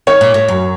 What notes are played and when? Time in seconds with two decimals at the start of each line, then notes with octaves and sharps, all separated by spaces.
0.07 D#3 C#5
0.21 A#2
0.34 A2
0.48 F#2